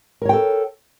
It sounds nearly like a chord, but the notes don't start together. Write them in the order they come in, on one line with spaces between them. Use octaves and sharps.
A#4 C#5 G5 A4